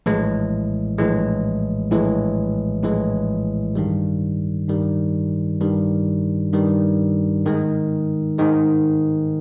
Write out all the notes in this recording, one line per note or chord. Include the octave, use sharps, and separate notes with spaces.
A#1 A2 E3 G#3
A#1 A2 E3 G#3
A#1 A2 E3 G#3
A#1 A2 E3 G#3
G2 D#3 G3
G2 D#3 G3
G2 D#3 G3
G2 D#3 G3
G#2 D#3 G#3
G#2 D#3 G#3